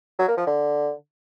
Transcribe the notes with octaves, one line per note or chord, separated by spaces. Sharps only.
F#3
A#3
F3
D3